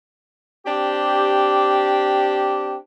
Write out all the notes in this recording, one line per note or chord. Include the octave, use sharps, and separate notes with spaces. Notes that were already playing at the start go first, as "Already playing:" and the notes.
C4 D4 G4